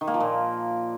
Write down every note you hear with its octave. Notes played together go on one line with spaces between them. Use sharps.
D#3
A#3
F3
A#2